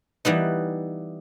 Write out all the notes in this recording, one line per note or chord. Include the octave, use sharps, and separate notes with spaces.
E3 G3 B3 D#4